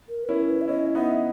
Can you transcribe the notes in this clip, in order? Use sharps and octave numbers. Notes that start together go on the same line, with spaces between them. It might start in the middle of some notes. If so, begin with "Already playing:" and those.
A#4
B4
C#4 E4 A#4
B4
E5
C#4 E4 D#5
B3 D#4 E5